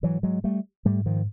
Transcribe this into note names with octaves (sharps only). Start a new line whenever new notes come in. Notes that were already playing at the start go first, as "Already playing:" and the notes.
G#2 E3 F#3
F#3 G#3
G3 A3
G#2 G3 A3
D#3 F3